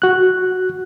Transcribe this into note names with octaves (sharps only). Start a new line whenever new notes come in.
F#4 F#6